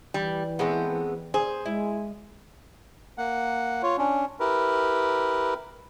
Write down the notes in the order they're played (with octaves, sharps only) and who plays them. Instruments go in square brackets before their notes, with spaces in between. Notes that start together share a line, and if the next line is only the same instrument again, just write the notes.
[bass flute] E3 [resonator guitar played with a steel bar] G3
[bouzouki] G#3 A3 C4 [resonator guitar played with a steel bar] B3
[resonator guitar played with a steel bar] G#4 [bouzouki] C5
[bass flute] G#3 [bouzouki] E4
[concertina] A#3 F#5
F4 C#5
C#4 D4
E4 G4 A#4 B4